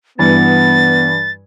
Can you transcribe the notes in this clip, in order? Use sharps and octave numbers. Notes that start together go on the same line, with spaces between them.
G2 E3 B3 A6